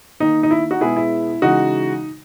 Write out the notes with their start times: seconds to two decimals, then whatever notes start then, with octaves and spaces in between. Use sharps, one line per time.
0.20 D#3 A#3 D#4
0.43 D#4
0.51 E4
0.71 D#4 F#4
0.81 B2 G#3 B3 E4 G#4
0.96 E4
1.42 C#3 E3 G#3 D#4 F#4